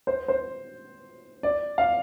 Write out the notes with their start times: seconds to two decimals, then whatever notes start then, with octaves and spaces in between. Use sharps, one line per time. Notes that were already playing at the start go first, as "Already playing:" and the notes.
0.07 C5
0.28 C5
1.43 D5
1.78 F5